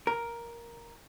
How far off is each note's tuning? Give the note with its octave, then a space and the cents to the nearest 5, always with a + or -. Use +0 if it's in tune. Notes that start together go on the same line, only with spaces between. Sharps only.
A#4 +5